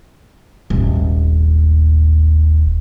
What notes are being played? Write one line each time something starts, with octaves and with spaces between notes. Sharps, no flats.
D#1 G#1